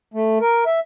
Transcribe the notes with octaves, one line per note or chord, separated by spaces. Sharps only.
A3
A#4
E5